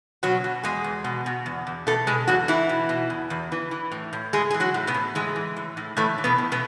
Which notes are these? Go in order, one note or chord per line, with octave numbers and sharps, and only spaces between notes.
B2 F#3 F#4
B2
E2 G#3 G#4
E2
B2
B2
E2
E2
B2 A3 A4
B2 G#3 G#4
E2 F#3 F#4
E2 E3 E4
B2
B2
E2
E2
E3
E3
A2
A2
E3 G#3 G#4
E3 G#4
F#3 F#4
A2
B2 B3
A2
E3 G#3
E3
A2
A2
A2 E3 A3
E3
B2 B3
A2
B2 B3